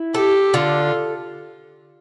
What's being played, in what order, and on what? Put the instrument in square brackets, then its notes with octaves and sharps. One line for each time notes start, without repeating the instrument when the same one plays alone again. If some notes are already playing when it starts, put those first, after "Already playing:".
Already playing: [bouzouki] E4
[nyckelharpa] G4 [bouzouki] A4
[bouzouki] D3 [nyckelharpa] F4